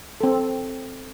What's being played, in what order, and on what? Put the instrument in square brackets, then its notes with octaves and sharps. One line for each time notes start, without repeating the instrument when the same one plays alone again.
[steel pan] C4 A4